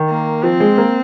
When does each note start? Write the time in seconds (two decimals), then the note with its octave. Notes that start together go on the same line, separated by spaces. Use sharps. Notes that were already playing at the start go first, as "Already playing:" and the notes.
Already playing: D#3
0.09 A#3
0.43 F3 C4
0.60 G#3
0.78 A#3